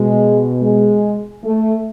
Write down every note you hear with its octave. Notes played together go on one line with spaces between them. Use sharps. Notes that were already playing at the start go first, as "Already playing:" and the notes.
Already playing: B2 G#3
G#3
A3